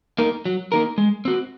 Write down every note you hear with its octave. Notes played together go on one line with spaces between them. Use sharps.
A#3 D#4 A#4
F#3
A#3 D#4 A#4
G#3
C4 F#4